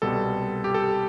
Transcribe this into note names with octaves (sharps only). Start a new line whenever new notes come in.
C2 B2 G3 A4
G4
A4